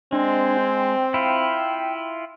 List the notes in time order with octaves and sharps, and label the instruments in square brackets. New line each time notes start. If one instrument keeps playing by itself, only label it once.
[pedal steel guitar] G#3 [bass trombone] C4 [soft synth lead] D4
[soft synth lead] G5
[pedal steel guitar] E4 F4